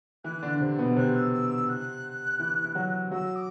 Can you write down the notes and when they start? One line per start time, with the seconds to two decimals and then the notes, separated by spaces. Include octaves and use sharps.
0.24 E3 E4 F#6
0.43 D3 D4
0.60 C3 C4
0.79 B2 B3
0.96 C3 C4 F#6
1.15 E6
1.32 E6
1.50 E6
1.68 F#6
2.40 E3 E4
2.65 E4
2.75 F#3 F#4
3.11 F#3 F#4 E6
3.35 D6